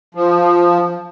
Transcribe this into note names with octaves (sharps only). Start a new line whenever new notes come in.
F3